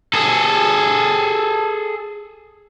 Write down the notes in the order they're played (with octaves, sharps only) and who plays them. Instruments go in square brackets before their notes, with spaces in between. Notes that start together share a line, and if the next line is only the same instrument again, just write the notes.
[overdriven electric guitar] G#4 A4